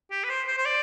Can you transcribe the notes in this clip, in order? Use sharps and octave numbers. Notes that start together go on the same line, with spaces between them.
G4
B4
C5
C5
C5
D5